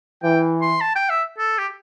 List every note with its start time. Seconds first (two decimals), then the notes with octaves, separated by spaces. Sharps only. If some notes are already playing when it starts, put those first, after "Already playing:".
0.23 E3 G5
0.61 C6
0.81 A5
0.96 G5
1.10 E5
1.38 A4
1.58 G4